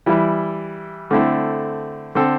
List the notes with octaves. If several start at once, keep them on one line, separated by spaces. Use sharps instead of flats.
E3 G3 E4
D3 A3 C4 E4
D3 C4 A4